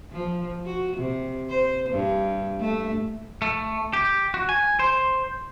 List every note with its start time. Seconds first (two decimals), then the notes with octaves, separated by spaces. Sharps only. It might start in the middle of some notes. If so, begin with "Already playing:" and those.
0.12 F3
0.66 F#4
0.97 C3
1.49 C5
1.90 G2
2.60 A3
3.42 A3
3.93 G4
4.34 F#4
4.49 G#5
4.79 C5